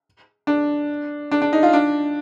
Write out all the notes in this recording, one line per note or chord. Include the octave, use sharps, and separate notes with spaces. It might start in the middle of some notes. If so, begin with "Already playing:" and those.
D4
D4
D4
D#4
F4
D4